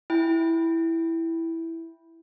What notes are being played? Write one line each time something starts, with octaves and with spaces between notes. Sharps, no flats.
E4 G5